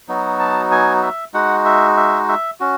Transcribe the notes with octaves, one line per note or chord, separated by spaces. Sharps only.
F#3 B3 D#4 F#4
A5
G#5
E5
G#3 D#4 F#4 F#5
E5
E5
E5
C#4 F#4